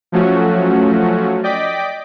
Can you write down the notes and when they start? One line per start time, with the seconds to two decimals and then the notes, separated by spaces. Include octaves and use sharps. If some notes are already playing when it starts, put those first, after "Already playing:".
0.12 F3 F#3 A3 C#4 F#4
1.43 D5 D#5 G5 D6 B6